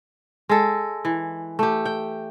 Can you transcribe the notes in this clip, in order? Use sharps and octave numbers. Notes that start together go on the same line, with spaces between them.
G#3 A4
E3
A3 G4
G5